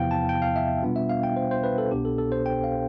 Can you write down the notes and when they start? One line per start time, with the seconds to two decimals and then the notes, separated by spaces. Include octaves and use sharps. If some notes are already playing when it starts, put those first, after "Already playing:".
Already playing: E2 C3 F3 B3 E4 F5 G5
0.11 A5
0.29 G5
0.42 F5
0.56 E5
0.83 B2 G3 B3 D4 F4
0.96 E5
1.09 F5
1.23 G5
1.36 C5
1.51 C5
1.64 B4
1.78 A4
1.91 C2 B2 B3 D4 G4
2.05 A4
2.18 A4
2.32 C5
2.46 G5
2.64 F5